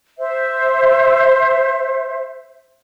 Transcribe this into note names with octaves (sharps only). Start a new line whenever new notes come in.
C5 E5